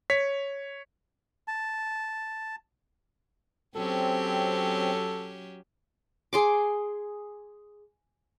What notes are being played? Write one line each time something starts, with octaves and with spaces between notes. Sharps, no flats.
C#5 B6
A5
F#3 C4 C#4 G4 A4
G#4 C6 D6